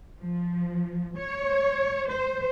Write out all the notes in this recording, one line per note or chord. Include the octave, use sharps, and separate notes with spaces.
F3
C#5
C5